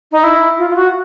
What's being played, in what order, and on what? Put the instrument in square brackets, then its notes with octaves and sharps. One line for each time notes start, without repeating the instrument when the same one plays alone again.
[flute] D#4
E4
F4
F4
F#4